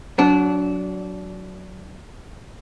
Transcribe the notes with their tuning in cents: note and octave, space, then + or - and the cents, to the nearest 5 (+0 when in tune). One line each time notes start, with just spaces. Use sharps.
F#3 +0 D4 -25